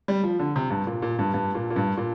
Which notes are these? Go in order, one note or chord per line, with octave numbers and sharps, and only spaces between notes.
G3
F3
D3
C3
G2
A#2
A#2
G2
G2
A#2
A#2
G2
A#2